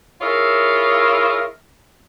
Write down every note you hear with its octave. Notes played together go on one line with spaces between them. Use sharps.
E4 F4 G#4 A#4 C#5 E5